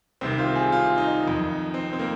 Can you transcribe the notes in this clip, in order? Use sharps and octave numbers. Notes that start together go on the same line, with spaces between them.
C2 C3 D#3 C4
F4
G#4
F4
D#4
F2 D#3
C4
C4
A#3